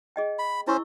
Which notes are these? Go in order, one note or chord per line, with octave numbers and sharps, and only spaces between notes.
G#4 D#5 G5
B5
C#4 E4 C5 C#6 E6